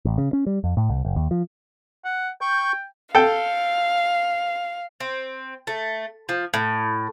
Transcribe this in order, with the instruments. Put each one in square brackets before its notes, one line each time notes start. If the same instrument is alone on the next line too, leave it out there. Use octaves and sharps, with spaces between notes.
[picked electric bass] A1
C#3
C#4
G3
F2
A2
C2
F#1
D#2
F3
[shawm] F#5
[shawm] G5 [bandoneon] C#6 G6
[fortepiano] A4 G5 [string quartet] F5
[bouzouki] C4
A3
F3
A2